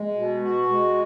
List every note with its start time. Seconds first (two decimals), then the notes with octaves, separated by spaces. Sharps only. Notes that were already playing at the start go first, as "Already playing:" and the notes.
Already playing: G#3
0.15 B2
0.42 F#4
0.69 G#3